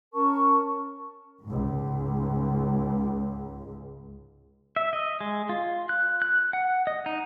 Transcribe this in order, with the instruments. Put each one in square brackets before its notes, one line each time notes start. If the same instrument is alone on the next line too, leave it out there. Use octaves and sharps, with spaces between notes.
[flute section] C#4 A#4 A5 C#6
[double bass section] C#2 G#2
[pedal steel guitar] E5
D#5
G#3
F4
F#6
F#6
F#5
D#5
D#4